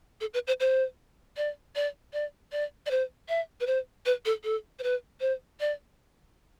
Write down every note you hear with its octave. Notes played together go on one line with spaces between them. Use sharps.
A4
B4
C5
C5
D5
D5
D5
D5
D5
C5
E5
B4
C5
B4
A4
A4
C5
B4
C5
D5